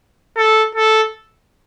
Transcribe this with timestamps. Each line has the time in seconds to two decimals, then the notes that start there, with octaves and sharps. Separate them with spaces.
0.37 A4
0.75 A4